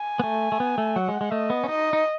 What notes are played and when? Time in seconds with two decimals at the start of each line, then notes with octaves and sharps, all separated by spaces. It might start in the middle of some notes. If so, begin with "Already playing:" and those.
Already playing: G#5
0.20 B3
0.24 A3
0.52 A3
0.60 B3
0.78 A3
0.96 F#3 F#5
1.08 G#3
1.21 G#3
1.32 A3 D#5
1.50 B3
1.64 C#4
1.68 D#4 D#5
1.93 D#4